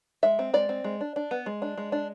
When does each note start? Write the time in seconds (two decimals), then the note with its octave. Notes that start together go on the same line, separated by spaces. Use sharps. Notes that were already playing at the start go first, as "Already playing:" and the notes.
0.23 G#3 E5
0.39 C4
0.54 G#3 D5
0.69 C4
0.84 G#3
1.01 D4
1.16 D4
1.31 B3
1.46 G#3
1.62 D4
1.78 G#3
1.92 D4